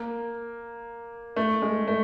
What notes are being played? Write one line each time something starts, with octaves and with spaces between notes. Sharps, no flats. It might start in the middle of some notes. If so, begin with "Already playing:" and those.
Already playing: A#3
A3
G#3
A3